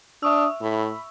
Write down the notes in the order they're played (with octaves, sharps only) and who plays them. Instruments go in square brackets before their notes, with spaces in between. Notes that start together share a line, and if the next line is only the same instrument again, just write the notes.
[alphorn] D4 [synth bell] E5 C#6 E6 [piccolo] D#6
[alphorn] A2 [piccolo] B5